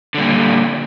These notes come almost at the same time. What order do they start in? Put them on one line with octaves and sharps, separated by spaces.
D3 G3 A#2